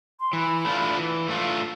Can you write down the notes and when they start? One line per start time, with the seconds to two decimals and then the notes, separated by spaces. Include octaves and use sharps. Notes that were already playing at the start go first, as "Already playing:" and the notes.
0.20 C6
0.33 E3 B5
0.65 A3 D4 F4
0.97 E3
1.28 A3 D4 F4